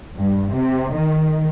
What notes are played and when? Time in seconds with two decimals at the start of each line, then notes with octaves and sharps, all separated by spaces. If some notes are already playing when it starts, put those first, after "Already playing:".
0.19 G2
0.55 C3
0.95 D#3